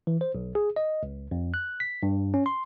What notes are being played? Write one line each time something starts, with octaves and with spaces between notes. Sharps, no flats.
E3
C5
B1
G#4
D#5
C#2
F2
F#6
B6
G2
C#4
C6